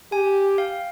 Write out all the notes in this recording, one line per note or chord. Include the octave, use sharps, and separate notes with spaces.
G4 G#5
F5 G5